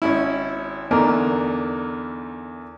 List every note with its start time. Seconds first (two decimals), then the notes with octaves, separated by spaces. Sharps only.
0.02 G#1 C#4 E4
0.91 E2 D3 D#4 A#4